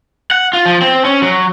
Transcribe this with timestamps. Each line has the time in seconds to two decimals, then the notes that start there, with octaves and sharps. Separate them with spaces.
0.31 F#5
0.53 F4
0.66 F3
0.82 C4
1.05 C#4
1.22 F#3